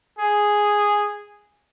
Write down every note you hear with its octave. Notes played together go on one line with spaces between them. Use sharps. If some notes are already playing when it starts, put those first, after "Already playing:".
G#4